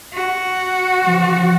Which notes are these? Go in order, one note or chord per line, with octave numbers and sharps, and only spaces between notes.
F#4
C#3 E3 F3